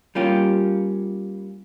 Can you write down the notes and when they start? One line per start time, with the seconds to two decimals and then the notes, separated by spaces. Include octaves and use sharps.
0.15 G3 A#3 C#4 F4 G4